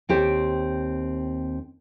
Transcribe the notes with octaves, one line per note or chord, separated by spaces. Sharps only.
D#2 C4 G4 C5 C#5